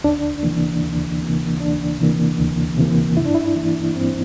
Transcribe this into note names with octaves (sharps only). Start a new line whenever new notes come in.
D2 D4
C3 E3 A#3
D2
C3 E3 A#3
D2 D4
C3 E3 A#3
D2
C3 E3 A#3
G2 E4
D4
E4
E3 A#3
G2 C4